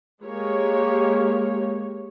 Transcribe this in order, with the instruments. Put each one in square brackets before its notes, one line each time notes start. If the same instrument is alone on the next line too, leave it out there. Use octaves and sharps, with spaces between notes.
[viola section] G#3 A#3 G4 C#5